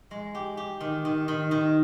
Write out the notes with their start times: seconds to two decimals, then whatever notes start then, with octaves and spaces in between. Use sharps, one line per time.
0.11 G#3
0.35 G4
0.57 G4
0.81 D#3
1.05 D#3
1.28 D#3
1.51 D#3